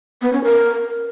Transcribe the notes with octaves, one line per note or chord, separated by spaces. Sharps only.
B3
C#4
A#4